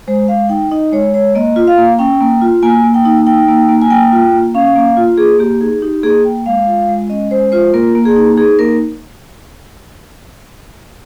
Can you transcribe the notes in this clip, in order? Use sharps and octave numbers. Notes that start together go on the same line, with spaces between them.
G#3 C5
G#3 F5
D#4 G5
D#4 D#5
G#3 C#5
G#3 C#5
A#3 D#5
F4
F5
A#3
C#4 G5
A#3
F4
A#3 G#5
A#3
G5
D#4
D#4 G5
A#3
A#3
G#5
A#3 G5
F4
A#3
C#4 F5
A#3
F4
A#3 G#4
A#3 G4
D#4 G#4
D#4 G4
A#3 G#4
A#3 G5
G#3 F5
F4
G#3
C#4 D#5
G#3 C5
F4 C5
A#3 A#4
A#3
G#4
D#4
D#4 G#4
A#3 A#4